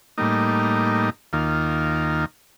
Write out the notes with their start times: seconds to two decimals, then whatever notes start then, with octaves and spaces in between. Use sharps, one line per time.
0.18 A2 G3 A#3 D#4
1.33 D#2 D#3 A#3 F4